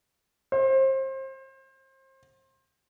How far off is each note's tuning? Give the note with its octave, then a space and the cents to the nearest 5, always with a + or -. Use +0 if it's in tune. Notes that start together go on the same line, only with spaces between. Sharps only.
C5 +30